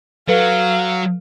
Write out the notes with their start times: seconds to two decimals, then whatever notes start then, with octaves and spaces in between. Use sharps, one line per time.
0.28 F#3 A4 B4 F5